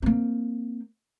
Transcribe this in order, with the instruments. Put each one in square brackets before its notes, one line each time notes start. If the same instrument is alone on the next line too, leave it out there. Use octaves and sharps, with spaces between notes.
[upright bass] A#3 C4